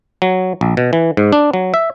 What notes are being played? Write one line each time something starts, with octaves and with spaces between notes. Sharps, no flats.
F#3
A#1
B2
E3
G#2
D4
F#3
E5